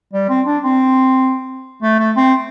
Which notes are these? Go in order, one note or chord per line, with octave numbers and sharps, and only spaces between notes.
G3
C4
D4
C4
A3
A3
C4